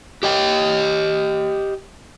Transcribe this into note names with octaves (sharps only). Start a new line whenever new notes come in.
G4 D#5 G5